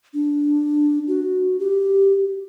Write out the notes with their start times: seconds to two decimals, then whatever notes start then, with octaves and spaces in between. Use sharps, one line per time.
0.14 D4
1.08 F#4
1.59 G4